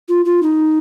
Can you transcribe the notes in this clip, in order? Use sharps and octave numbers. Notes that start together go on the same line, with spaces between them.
F4
F4
D#4